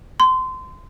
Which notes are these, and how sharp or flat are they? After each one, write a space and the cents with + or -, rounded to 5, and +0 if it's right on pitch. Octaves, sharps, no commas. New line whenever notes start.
C6 -25